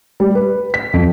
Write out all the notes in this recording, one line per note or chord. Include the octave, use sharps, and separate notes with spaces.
G3
B4
B6
F2